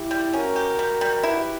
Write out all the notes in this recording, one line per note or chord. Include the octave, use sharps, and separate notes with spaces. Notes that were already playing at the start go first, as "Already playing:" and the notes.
Already playing: E4 G4
G3
C#4 F#4 A#4
G4
G3
G3
E4 G4 B4